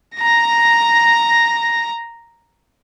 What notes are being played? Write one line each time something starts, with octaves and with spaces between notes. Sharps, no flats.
A#5 A#6